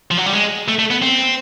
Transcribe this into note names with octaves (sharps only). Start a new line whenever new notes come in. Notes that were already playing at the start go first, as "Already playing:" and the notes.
F3
F#3
G3
G#3
A3
A3
B3
C4